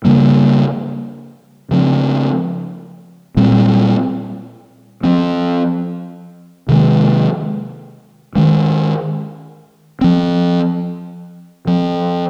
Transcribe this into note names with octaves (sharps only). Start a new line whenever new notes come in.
C#3 G3 A#3
C#3 F3 C4
A#2 G3 C4
F3 C4
C3 D#3 G#3
D#3 G#3 C#4
F3 C4
F3 C4